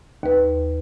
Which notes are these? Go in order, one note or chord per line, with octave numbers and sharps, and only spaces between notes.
D#2 B4